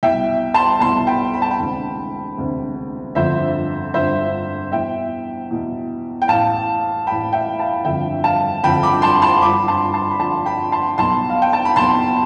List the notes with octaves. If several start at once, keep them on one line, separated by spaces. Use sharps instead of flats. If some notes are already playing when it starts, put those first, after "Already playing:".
C2 B2 E5 G5
A5 C6
C2 B2 A5 C6
G5 B5
B5
A5
G5 B5
E1 D2 C3
E1 D2 C3
G1 F2 D3 F3 C5 E5
G1 F2 D3 F3 C5 E5
E2 B2 E5 G5
E2 B2
G5
A1 A2 E3 F5 A5
A1 A2 E3 G5 B5
E5 G5
F5 A5
G1 F2 D3 F3 E5 G5
F5 A5
G1 F2 D3 F3 G5 B5
B5 D6
A5 C6
A5 C6
G1 G2 F3 B5 D6
A5 C6
A5 C6
B5
G1 G2 F3 A5 C6
G5 B5
A5 C6
B1 B2 A5 C6
F5
G5
A5
B5
B1 B2 A5 C6